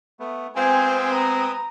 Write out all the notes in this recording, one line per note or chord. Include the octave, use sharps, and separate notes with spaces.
A3 B3
G#3 B3 C4 F4 F5 G5 G#5
B4 A#5 D#6